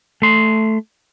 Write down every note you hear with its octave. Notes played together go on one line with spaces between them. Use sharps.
A3 C6